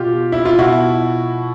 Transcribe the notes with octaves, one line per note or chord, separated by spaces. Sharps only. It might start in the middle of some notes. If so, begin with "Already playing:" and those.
Already playing: B2 F4 G4
E4
F4
B2 E4 F#4